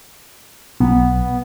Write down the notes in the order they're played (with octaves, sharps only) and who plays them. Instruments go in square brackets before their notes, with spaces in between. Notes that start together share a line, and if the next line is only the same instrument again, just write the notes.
[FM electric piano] B1 [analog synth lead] B3